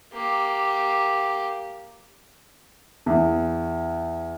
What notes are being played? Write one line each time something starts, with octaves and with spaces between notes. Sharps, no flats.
A#3 G4
E2